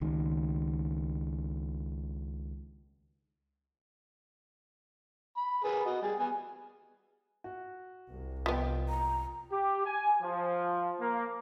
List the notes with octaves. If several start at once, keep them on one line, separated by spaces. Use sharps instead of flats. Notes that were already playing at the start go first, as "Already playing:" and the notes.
C#2 D#3
B5
G#4 A#4 B4
F#4 D#5
G3 G#4
B3 G#5
F#4
C2
F3 B3 F4 D#5 G5
A#5
G4
G#5
F3
A#3